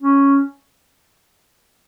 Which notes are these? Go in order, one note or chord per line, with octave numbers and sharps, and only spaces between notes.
C#4